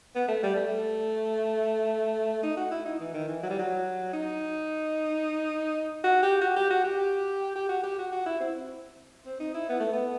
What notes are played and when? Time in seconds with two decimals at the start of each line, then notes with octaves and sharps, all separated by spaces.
0.15 B3
0.28 A3
0.43 G3
0.55 A3
2.43 D#4
2.57 F#4
2.71 E4
2.85 D#4
2.99 E3
3.14 D#3
3.28 E3
3.43 F#3
3.50 G3
3.59 F#3
4.13 D#4
6.04 F#4
6.22 G4
6.41 F#4
6.56 G4
6.70 F#4
6.84 G4
7.55 G4
7.69 F#4
7.83 G4
7.98 F#4
8.12 F#4
8.26 E4
8.40 C4
9.26 C4
9.40 D#4
9.54 E4
9.69 B3
9.80 A3
9.93 B3